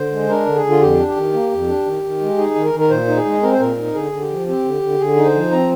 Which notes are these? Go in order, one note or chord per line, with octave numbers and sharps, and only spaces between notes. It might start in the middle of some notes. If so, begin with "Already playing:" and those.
Already playing: D3 C5
G#3
D4 A#4
D3
G#4
D3
F4
F2 G4
D4
G4
D#3
A#3
F2
D4
D#3
D#3
G#3
D#4 G#4
D#3
A#4
D#3
A#4
A#2 C5
D#4
G#4
G#3
C4 A#4
C5
A#2 A#4
D#4
D3 G#4
D3
G4
F3
C4 G4
D3
D3
D3 G#4
D#4
C5
F3
C4 A#5